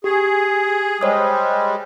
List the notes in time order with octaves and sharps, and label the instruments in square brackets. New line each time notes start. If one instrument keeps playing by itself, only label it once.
[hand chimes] G4 [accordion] G#4
[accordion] G3 G#3 [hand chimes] C5 C#5 D#6